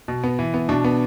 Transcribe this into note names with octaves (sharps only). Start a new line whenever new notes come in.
B2
B3
E3
B3
B2 D4
B3